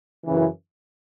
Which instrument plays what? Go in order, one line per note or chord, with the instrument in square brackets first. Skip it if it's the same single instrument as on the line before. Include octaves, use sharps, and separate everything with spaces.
[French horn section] F#2 C#3 E3